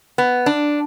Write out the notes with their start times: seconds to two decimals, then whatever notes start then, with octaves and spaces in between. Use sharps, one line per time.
0.18 B3
0.46 D4